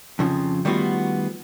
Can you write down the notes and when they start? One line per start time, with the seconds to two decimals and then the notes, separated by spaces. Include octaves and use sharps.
0.19 F2 C#3 F3
0.65 D#3 G3 A3 B3 F4 F#4